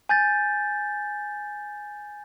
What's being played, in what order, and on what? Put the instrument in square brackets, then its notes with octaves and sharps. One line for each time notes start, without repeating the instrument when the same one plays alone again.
[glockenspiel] G#5 G6 A6